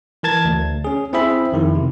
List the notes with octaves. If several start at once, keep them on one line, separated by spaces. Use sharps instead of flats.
E3 A#4 A5 G#6 A6
D2
C#4 G#4
C4 E4 G#4 C5 E5 B5
F2 D#3 E4
C3